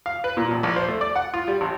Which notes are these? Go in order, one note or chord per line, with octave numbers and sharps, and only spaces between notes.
F5
B4
A#2
A1
A#1
C5
A3
D5
F#5
F4
G3
A1